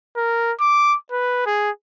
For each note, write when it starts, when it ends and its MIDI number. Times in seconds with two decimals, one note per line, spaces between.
0.17 0.52 70
0.61 0.96 86
1.12 1.43 71
1.46 1.71 68